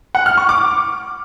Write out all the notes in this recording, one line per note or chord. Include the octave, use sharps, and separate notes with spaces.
F#5
F6
C#6
D6